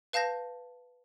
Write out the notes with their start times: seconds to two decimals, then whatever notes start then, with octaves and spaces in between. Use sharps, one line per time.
0.13 B4 F5 A5 G6 A#6